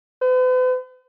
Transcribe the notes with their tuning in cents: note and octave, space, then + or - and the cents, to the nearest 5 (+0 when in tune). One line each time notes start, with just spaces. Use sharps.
B4 +45